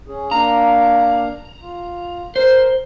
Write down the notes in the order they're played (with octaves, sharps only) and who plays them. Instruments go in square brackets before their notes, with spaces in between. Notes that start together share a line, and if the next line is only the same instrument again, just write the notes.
[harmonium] C#4 G#4
[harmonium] A#3 D4 F5 [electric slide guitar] A#5
[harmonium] F4
[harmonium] A#4 [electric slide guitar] C5